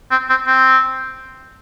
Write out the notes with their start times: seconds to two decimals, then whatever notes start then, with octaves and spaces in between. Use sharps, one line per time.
0.11 C4
0.30 C4
0.47 C4